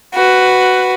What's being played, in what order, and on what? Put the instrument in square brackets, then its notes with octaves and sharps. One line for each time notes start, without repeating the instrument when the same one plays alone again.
[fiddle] F#4 B4